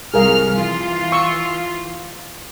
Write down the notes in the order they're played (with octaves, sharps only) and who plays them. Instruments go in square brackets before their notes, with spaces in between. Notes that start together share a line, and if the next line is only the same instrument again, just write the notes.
[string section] C2 F6 [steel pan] G#4 A#4 F5
[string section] E3 F4
[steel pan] C#6 E6